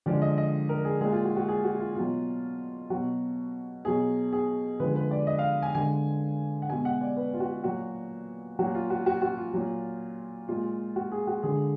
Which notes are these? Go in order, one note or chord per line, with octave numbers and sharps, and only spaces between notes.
D3 F3 G#3 D5
D#5
D#5
A#4
G#4
A#2 G#3 G#4
F4
F#4
F#4
G#4
F#4
F4
B2 F#3 F4
B2 F#3 F#4
B2 F#3 G#4
G#4
D3 F3 G#3 B4
B4
D5
D#5
F5
G#5
D3 G#3 G#5
F#5
B2 G#3 G#5
F#5
D5
B4
F4
F#4
A#2 F#3 F#4
A#2 F#3 F#4
F4
F#4
F#4
F#4
F4
A#2 F#3
A#2 G#3 F4
F#4
G#4
F#4
D3 G#3 G#4